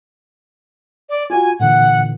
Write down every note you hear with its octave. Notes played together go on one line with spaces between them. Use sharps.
D5
F4 F#4 G#5
A#2 D3 E3 F#5